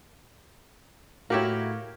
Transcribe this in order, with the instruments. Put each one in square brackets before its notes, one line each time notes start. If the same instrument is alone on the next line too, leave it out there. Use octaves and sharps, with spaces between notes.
[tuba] A2 [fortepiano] A#3 G4 C#5 [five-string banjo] E4 F#4